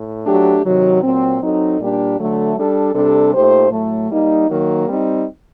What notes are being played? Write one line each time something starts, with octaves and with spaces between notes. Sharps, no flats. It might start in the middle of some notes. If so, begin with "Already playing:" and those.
Already playing: A2
F#3 A3 D4 G4
C3 D#3 F#3
A#2 F#3 C4
F#3 C4 D#4 A4
A#2 G3 A#3 D4 G4
D3 F#3 A3
G3 D4 A4
C3 G3 D4 A4
A#2 A3 D#4 G4 C5
A2 F#3 A3
G3 A#3 D#4
D#3 F#3 A#3
G3 C4 D#4